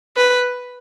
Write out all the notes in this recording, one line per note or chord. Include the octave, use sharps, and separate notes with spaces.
B4